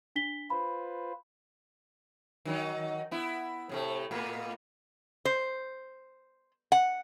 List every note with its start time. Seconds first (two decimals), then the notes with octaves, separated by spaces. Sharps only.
0.16 D4 B6 G7
0.50 F4 B4 C5 B5
2.45 D#3 F#3 D#4
3.11 B3 E4
3.69 A2 C3 A3
4.11 A2 A#3 B3
5.25 C5
6.72 F#5